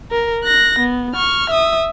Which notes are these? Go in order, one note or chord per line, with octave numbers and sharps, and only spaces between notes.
A#4
F#6 A#6
B3
C#6 F6
E5 D#6